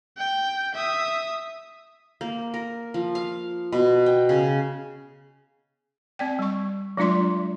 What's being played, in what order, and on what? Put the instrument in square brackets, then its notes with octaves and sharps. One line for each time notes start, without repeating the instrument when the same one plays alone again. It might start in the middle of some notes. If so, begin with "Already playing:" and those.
[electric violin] G5
E5 D#6
[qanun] A#3
A#4
F3
F5
B2
G5
C#3
[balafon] C4 D5 G5
G3 C#6
F#3 G#3 D4 F4 D5 C6